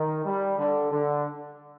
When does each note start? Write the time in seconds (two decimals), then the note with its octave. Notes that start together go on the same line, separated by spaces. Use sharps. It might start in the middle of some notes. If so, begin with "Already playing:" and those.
Already playing: D#3
0.25 G3
0.58 D3
0.91 D3